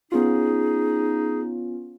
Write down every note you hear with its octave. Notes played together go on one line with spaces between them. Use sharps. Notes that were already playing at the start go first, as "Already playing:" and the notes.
B3 C#4 D#4 F4 G#4